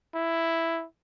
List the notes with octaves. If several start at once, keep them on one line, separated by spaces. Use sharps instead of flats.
E4